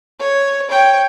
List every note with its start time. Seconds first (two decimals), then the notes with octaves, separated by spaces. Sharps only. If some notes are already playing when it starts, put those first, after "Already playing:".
0.20 C#5
0.70 C#5 G5